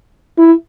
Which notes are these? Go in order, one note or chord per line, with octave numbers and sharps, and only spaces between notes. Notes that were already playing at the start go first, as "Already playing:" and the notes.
E4